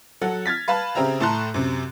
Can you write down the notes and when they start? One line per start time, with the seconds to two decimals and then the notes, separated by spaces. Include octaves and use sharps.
0.21 F#3 A4 F#5
0.46 F6 G#6 A6 B6
0.68 B4 F5 A5 B5
0.95 C#3 C4 G4 E5 A#5
1.20 A2 A3 A5 A#5 C6 F#6
1.54 F#2 C3